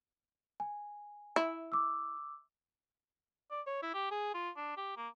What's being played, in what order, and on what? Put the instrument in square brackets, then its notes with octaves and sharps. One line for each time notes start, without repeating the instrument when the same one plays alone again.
[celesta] G#5
[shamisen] E4
[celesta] D6 E6
[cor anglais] D5
C#5
E4
G4
G#4
F4
D4
G4
A#3